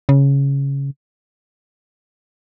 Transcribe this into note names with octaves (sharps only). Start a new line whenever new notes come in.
C#3